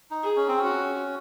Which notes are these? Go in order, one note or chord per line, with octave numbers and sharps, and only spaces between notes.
D#4
G#4
C#4
C4
C#4 F#4